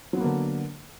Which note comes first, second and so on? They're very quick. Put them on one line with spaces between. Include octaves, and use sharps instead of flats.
F#3 B3 A#3 D3